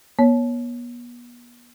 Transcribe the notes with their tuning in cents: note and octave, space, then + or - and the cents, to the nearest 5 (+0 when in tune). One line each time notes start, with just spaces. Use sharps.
B3 -35 C#5 +0